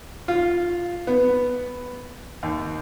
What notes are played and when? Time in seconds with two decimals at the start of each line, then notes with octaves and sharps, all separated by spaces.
0.28 F4
1.07 B3
2.43 D#2